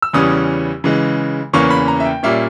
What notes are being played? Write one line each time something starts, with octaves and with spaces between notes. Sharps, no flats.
E6
E2 C#3 E3 G3 C#4 D#6
C#3 E3 G#3
E2 C#3 E3 A#3 C#4 C#6
B5
A#5
E5
G5
A#2 G3 A#3 C#4 E5